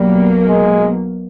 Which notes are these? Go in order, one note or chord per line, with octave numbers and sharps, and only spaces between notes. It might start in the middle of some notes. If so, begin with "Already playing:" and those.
Already playing: B1 B2 F#3 G3 A#3
G#3